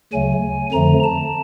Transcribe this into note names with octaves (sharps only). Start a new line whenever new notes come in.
D2 C#3 F#3 A3 G#5
F2 D3 F3 A3 A#5
A5